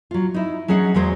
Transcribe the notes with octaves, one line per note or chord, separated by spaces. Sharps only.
F#3 F4
D#4 E4
F#3 C#4 G#4 D#5 F#5
E2 F#3 G#3 C5